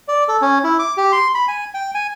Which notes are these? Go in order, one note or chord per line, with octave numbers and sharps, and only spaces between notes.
D5
A4
C#4
E4
D6
G4
C6
B5
G#5
G5
G#5